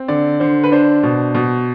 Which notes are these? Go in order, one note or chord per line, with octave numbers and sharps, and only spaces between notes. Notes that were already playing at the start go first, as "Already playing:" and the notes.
Already playing: C4
D3 D5
D3 C5
B4
D4 C5
B2
B2